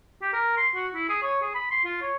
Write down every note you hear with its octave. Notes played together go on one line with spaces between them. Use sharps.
G4
A#4
C6
F#4
E4
G#4
C#5
G#4
B5
C6
F4
C#5